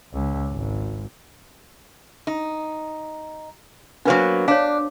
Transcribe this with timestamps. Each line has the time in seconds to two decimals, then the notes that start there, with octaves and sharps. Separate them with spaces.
0.13 C#2
0.52 G#1
2.27 D#4
4.05 F#3 A#3 B3 D4 B4 C5
4.48 D4 C#5 F5